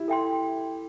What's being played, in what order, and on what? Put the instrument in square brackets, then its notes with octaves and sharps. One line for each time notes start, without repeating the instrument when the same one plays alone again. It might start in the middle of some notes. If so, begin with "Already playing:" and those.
Already playing: [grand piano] E4 G4
[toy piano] A4 E5 G5 C6